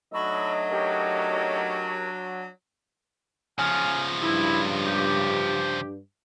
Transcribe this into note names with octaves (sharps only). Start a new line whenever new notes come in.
F#3 A3 D4 D#4 D#5 B5 C#6 E6
C#4 G4 A#4
C#3 F3 G#5 F6
G2 E4
G4